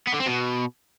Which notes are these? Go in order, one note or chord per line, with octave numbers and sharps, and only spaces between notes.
B3
D3
C4
B2